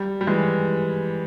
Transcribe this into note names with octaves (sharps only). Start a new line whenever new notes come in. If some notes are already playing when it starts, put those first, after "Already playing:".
Already playing: G3
G3
E3 G#3